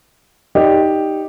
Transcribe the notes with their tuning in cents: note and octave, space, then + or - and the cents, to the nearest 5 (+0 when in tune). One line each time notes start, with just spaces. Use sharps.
D#4 +0 G4 +0 D5 -10